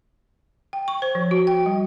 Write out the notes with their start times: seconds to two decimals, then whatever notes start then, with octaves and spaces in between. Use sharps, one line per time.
0.73 G5
0.88 C#6
1.02 C5
1.15 F3
1.31 F#4
1.47 G5
1.66 G3